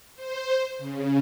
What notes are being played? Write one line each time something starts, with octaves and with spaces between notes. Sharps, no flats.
C5
C#3